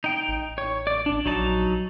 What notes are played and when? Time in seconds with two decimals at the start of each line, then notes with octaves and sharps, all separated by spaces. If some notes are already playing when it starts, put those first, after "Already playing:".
0.04 D#4 G5
0.29 A1
0.58 C#5
0.87 D5
1.06 D4
1.26 A#1 F#3 D#4 A5